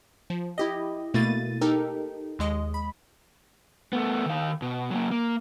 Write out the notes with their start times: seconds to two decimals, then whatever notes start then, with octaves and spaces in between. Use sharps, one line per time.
0.30 F3
0.58 E4 G4 D#5
1.14 B2 A3 A#3 E4 A6 D#7
1.61 D#4 G4 A4 A#4
2.39 D#2 G#3 D#5
2.74 B5
3.93 A3 B3
4.26 D#3 F5
4.62 B2
4.90 F#3 A#3
5.11 A#3